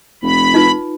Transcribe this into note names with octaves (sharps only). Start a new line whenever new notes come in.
F1 B5
D#4 F4 B4